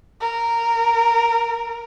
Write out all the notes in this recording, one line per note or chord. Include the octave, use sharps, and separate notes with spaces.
A#4